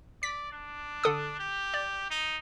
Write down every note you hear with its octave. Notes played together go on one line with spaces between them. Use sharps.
D5 B6
D4
D3 A4 D#6
G4
D5
D#4